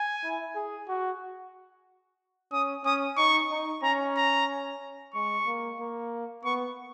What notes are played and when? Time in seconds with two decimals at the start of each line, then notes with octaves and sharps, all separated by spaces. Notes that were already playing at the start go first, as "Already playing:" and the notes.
Already playing: G#5
0.24 E4
0.55 G#4
0.88 F#4
2.52 C#4 D#6
2.84 C#4 D#6
3.17 D#4 C#6
3.51 D#4
3.83 C#4 A#5
4.16 A#5
5.15 G#3 C#6
5.47 A#3
5.79 A#3
6.45 B3 C#6